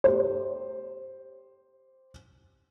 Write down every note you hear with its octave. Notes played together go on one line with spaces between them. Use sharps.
G4 C5